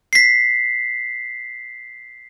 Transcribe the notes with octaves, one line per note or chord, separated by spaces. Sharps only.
B6 C7